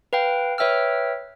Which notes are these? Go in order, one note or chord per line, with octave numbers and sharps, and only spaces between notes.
B4 F5 G5
B4 C#5 E5 G5 E6 F6